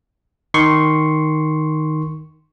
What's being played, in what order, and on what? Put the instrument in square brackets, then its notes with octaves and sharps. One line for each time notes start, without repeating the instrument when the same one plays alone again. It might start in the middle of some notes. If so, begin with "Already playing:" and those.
[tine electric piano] D#3 C6 C#6